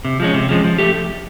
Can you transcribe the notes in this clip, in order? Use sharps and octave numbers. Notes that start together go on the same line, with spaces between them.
C3
F3 G#3 C#4
C3
F3 G#3 C#4
F3
A3 G4